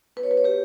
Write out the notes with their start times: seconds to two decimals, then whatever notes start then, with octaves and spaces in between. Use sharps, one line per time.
0.16 B3 B4
0.20 F#4 C#5
0.31 B4
0.37 C#5
0.44 G4 B4